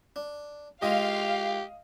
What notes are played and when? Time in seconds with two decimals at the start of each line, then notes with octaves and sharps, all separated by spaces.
0.16 D4
0.82 G#3 F4 G4 G#4 D#5 F5